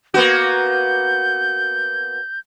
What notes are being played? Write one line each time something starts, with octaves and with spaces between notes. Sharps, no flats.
A#3 B3 F#4 G6